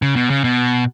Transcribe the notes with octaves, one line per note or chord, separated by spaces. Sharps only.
C#3
B2
C#3
B2